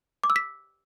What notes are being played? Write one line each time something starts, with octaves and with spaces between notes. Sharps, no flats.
D6
E6
B6